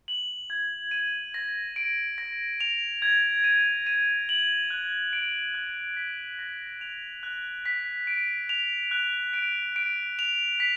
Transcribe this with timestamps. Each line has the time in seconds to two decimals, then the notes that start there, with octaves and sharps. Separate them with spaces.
0.08 F#7
0.50 G#6
0.91 D#7
1.34 A#6
1.76 D7
2.18 A#6
2.60 F7
3.02 G#6
3.44 D#7
3.87 D#7
4.29 F#7
4.70 F#6
5.13 D7
5.54 F#6
5.97 B6
6.39 A#6
6.81 F7
7.23 F#6
7.66 B6
8.07 D7
8.49 F7
8.91 F#6
9.33 D7
9.76 D7
10.19 F7
10.60 B6